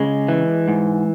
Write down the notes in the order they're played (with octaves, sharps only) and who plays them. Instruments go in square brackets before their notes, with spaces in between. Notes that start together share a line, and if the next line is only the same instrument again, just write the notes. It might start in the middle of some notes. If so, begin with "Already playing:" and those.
Already playing: [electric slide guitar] C#3 G#3
E3
G#2